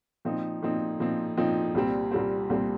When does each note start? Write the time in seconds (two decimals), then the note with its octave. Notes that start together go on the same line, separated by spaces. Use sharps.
0.25 A#2 F3 C4 D#4
0.62 A#2 F3 C4 D#4
1.00 A#2 F3 C4 D#4
1.37 A#2 F3 C4 D#4
1.75 C2 A#2 G3 C4
2.11 C2 A#2 G3 C4
2.50 C2 A#2 G3 C4